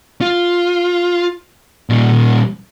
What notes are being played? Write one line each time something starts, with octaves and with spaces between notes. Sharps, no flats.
F4
A#2 G3